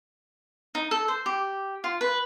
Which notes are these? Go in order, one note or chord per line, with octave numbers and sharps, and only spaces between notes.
D#4
A4
C5
G4
F4
B4